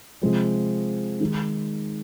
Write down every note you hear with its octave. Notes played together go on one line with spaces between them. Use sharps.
C3 F3 G#3 C4
D#3 G#3 D#4